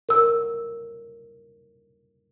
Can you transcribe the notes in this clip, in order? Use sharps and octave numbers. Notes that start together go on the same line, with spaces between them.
A#4 E6